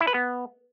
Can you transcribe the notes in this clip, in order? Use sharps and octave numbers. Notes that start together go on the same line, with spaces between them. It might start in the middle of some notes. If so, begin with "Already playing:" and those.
E4
B4
B3